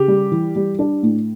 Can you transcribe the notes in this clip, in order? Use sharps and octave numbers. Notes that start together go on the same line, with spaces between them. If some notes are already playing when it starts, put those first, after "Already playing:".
Already playing: C#3 G4
G3
E3
G3
D4
A2